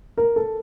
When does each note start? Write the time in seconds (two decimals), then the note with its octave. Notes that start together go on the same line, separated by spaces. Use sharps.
0.18 A#4
0.36 A4